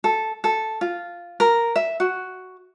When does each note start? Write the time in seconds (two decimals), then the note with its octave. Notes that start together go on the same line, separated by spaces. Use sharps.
0.04 A4
0.44 A4
0.81 F4
1.40 A#4
1.76 E5
2.00 F#4